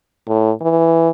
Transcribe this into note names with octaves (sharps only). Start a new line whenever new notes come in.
A2
E3